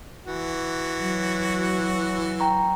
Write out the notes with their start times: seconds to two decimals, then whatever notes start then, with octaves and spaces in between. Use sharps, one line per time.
0.27 E3 F#4
1.00 F#3
2.40 G5 A#5 C#6